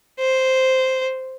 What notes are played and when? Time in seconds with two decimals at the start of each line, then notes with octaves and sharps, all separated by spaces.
0.20 C5